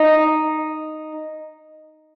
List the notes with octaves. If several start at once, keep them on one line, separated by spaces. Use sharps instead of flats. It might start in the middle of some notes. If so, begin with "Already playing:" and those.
Already playing: D#4